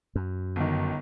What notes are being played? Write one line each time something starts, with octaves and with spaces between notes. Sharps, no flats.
F#2
G1 D#3